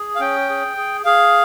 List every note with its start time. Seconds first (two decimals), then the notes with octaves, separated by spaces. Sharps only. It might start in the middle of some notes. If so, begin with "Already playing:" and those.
Already playing: G#4
0.16 F5
0.20 C#4 G5
0.50 G#4
0.77 G#4
1.05 G#4 F5